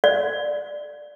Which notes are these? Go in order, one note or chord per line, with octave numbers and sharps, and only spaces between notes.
D5